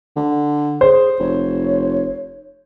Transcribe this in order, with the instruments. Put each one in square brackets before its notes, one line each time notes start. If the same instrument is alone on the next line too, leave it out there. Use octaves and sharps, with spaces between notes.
[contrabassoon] D3
[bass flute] G#4 [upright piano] C5
[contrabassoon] F1 [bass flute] C#5